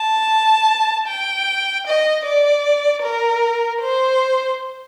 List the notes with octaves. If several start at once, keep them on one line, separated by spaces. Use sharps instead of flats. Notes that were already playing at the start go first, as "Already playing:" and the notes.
Already playing: A5
G5
D#5
D5
A#4
C5